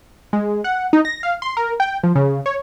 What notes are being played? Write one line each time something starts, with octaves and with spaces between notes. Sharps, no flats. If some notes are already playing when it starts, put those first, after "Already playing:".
G#3
F#5
D#4
A#6
F5
C6
A#4
G5
F3
C#3
C#5